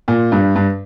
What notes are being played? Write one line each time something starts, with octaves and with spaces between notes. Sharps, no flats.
A#2
G2
G2